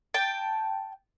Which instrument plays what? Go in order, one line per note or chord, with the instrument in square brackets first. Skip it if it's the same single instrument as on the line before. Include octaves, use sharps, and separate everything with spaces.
[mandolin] G5 A5